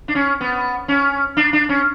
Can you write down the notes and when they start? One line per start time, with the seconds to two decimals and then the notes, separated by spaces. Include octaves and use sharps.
0.08 D4
0.15 C#4
0.41 B3
0.88 C#4
1.37 D4
1.53 D4
1.69 C#4